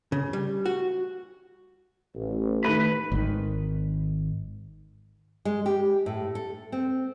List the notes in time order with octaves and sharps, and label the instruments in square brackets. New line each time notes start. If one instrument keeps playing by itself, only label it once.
[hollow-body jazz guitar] C#3
G3
F#4
[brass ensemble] A1
[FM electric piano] D#3 A3 [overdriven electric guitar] B4 B5
[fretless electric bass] G#1 G#2 D#3
[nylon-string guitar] G#3
G4
A2
A4
C4